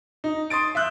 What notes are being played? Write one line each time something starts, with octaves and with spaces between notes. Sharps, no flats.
D#4
C6 D#6 A6 D7
E5 E6 F#6 G6